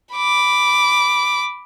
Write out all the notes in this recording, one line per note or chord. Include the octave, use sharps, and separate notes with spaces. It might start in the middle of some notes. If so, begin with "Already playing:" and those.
B5 D6